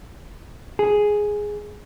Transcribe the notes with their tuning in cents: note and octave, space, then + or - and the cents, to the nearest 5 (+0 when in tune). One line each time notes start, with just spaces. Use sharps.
G#4 +0